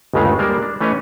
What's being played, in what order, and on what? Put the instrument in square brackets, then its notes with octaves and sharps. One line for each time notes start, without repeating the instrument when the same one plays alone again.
[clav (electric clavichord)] G1 D#2 C#3 G#3 A3 F5
G3 G#3 A#3 A#4 C5 D5
D4
E3 A3 C#4 B4 C#5 D#5